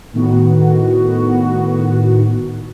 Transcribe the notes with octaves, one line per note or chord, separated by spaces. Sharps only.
A2 D#3 B3 F#4